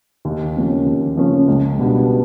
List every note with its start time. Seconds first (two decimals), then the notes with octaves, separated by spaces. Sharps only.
0.25 D#2
0.56 C#3 F3 A#3 C#4
0.86 D#2
1.17 C#3 F3 A#3 C#4
1.48 C#2
1.79 B2 G3 B3 D4